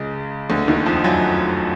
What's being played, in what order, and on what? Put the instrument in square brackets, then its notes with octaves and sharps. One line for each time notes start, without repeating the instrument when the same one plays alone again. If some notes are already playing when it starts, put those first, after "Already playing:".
Already playing: [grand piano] C#2 C#3
D2 D3
D#2 D#3
F2 F3
F#2 F#3